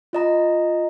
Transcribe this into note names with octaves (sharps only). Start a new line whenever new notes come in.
F4 D#5 A#5